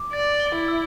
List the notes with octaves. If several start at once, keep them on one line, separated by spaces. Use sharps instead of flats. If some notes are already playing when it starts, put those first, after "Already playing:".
Already playing: D6
D5 A6
G7
E4
E6